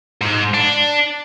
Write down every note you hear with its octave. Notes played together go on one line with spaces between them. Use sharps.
G#2
D4